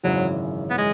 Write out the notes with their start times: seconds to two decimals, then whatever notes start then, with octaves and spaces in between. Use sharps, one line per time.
0.03 G#1 F#2 C#3 E3 F#3
0.70 B3
0.78 G#3